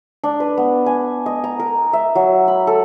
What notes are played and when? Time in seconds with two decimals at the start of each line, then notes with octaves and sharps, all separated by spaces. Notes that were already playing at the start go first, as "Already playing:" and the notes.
0.24 D4
0.40 B4
0.58 B3
0.86 G#5
1.26 D#5
1.44 A#5
1.59 A#4
1.93 E5
2.15 F#3
2.48 B5
2.67 A4